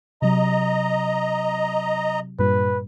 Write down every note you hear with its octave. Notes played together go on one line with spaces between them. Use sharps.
C3 F#3 D#5 A#5
G2 A#2 G3 B4